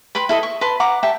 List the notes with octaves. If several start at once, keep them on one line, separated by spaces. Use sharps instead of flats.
B4 G5 B5 C6
E4 A4 D#5
C#6
B4 A5 C6
F#5 A#5 D6
G4 E5 G5 A5